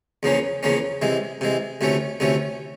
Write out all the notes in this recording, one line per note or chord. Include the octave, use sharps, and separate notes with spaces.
E2 C#3 F3 A#3 C#4
E2 C#3 F3 A#3 C#4
C3 E3 G#3
C3 E3 G#3
D2 C3 E3 A3 C#4
D2 C3 E3 A3 C#4